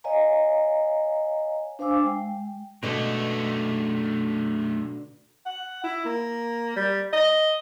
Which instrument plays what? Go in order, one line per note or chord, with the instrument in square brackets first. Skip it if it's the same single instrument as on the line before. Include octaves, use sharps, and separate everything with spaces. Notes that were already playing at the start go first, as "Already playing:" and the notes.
[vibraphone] C#5 D#5 F5 G#5 A#5
D4 C5 F5 G#5 D6 E6
G#3 G5
[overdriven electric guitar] F#2 A3 [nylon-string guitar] B2 D3 G#3
[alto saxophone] F#5
E4
A#3
G3
D#5